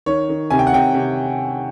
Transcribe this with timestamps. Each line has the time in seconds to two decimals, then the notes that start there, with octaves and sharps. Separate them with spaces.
0.06 D#3 C#5
0.29 D#3
0.50 C3 G#5
0.59 G5
0.67 F#5
0.73 C3 G5
0.94 C3